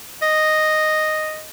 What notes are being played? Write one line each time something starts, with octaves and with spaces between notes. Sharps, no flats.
D#5